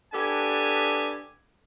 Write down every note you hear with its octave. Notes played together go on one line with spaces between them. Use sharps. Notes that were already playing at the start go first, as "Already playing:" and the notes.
B3 D4 G4 A4 G#5